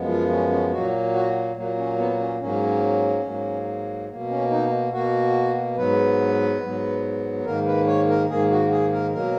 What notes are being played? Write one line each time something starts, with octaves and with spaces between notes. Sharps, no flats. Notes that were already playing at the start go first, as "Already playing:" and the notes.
Already playing: F#2 F3 G#3 B3
F4
C#4
C#4
A#2 F#3 A#3 F#4
F#4
A#2 F#3 A#3
C#4
B3
C#4
G#2 F#3 A#3 C#4
G#2 F#3 A#3
B2 A#3
C#4
D#4
B2 A#3 F#4
G#2 F#3 B3 B4
G#2 F#3 B3
G#2 D#3 A#3 A#4
B4
C#5
A#4
G#2 D#3 A#3 G#4
F#4
G#4
A#4
B2 F#3 A#3 A#4